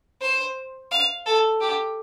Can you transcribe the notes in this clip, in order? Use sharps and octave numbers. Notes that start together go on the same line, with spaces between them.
C5
F5
A4
G4